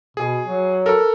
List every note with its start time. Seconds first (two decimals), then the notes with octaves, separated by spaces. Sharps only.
0.17 B2 G#4
0.42 F#3
0.86 A4 A#4